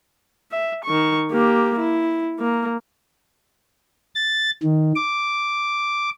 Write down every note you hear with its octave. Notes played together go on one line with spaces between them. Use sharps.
E5
D#3 C#6
A#3 G4
E4
A#3
A6
D#3
D6